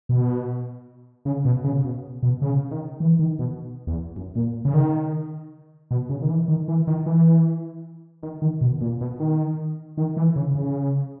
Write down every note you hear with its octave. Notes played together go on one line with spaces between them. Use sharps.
B2
C#3
B2
C#3
B2
B2
C#3
D#3
E3
D#3
B2
E2
F#2
A#2
C#3
D#3
B2
C#3
D#3
E3
D#3
E3
D#3
E3
D#3
D#3
B2
A#2
B2
D#3
D#3
E3
C#3
C#3